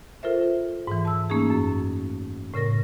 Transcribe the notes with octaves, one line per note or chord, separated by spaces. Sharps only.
F4 A4 A#4 C5 E5
G#2 E3
A5 E6
A3 A#3 C#4 D#4 G#4
F#2
A2 C#3 A#4 A#6